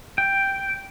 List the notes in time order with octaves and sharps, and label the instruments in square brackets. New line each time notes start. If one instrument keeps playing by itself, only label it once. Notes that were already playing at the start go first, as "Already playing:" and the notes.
[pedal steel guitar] G5